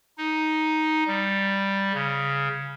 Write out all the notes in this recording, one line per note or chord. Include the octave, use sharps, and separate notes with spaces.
D#4
G3
C#3